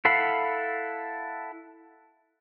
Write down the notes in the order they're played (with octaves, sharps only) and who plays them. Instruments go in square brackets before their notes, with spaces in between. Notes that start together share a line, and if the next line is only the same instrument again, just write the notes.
[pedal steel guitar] E4 A4 F5 F#5 B5